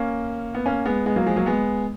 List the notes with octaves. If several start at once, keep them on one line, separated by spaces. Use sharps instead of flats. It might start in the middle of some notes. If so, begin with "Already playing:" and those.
Already playing: A#3 C#4
B3
A#3 C#4
G#3 B3
G#3 B3
F#3 A#3
F3 G#3
F#3 A#3
G#3 B3